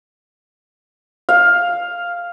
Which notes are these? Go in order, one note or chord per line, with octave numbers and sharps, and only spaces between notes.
F5